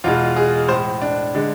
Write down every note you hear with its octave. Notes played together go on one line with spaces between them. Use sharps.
E2 B2 G#3 F4
G#4
A2 G#3 C5
D4
D3 G#3